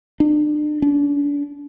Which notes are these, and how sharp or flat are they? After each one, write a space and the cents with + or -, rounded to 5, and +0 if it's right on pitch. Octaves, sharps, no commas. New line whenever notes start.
D4 +35
D4 -35